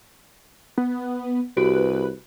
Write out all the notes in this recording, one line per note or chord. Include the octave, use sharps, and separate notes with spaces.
B3
C2 F#4 G4 B4 D7